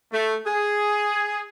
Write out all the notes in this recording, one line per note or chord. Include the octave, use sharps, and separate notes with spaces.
A3
G#4